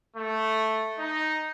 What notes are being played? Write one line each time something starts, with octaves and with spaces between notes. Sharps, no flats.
A3
D#4